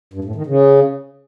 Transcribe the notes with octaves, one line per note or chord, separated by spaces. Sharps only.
G2
A2
D#3
C#3